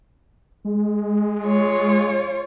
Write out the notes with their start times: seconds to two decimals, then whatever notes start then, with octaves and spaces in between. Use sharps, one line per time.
0.65 G#3
1.43 F4 C#5